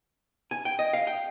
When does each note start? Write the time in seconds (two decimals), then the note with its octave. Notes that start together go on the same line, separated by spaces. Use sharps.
0.51 G#5
0.65 G5
0.79 D#5
0.93 F5
1.07 G5